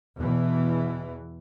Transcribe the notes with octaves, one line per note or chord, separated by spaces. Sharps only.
E2 B2 E3